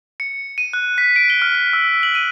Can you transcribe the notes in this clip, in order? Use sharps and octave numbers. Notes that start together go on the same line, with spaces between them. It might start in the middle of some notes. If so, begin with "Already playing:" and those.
C#7
D#7
F#6
B6
D7
G7
F6
G7
E6
F#7
D#7